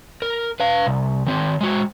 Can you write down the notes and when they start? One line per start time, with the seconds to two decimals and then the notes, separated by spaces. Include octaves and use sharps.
0.22 A#4
0.60 B4 F5
0.86 C2
1.26 D#3 C4
1.61 G#3 F#4